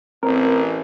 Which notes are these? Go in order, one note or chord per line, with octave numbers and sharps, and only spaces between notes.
A1 C4 A#4